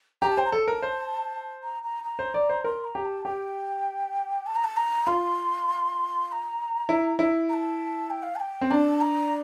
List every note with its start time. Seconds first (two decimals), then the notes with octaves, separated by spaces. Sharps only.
0.22 G4 A#5
0.30 A5
0.37 C5 G5
0.46 A#5
0.49 A4 A5
0.68 A#4
0.82 C5
1.63 A#5
1.83 A#5
2.04 A#5
2.19 C5
2.34 D5
2.49 C5
2.64 A#4 C6
2.84 A#5
2.95 G4
3.05 A5
3.25 G4 G5
4.46 A5
4.55 A#5
4.64 A5
4.77 A#5
5.07 F4 C6
6.28 C6
6.32 A#5
6.89 E4
7.19 E4
7.49 A#5
7.53 A5
8.10 G5
8.23 F5
8.36 A5
8.40 G5
8.61 C4
8.71 D4 A#5
8.74 A5
9.01 A#5